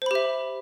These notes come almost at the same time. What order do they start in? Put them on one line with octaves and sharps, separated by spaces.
C5 B5 G4 E5